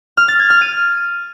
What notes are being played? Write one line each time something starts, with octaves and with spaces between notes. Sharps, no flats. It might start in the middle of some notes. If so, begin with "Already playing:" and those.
F6
A6
G#6
F6
D#7